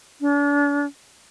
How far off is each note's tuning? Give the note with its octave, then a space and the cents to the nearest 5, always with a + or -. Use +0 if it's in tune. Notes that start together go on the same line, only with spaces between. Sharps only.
D4 -40